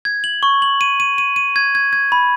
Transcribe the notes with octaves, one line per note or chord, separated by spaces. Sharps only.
G#6
F#7
C#6
F#7
D#7
D#7
D#7
D#7
G#6
G#6
G#6
B5